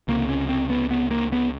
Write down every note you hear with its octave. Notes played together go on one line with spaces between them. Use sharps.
C#2 C3 A#3
C#4
C4
B3
B3
A#3
B3